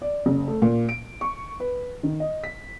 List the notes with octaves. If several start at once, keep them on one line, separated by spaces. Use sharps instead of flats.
D5
F#1
A3
A#2
D7
C#6
B4
D#3
D#5
B6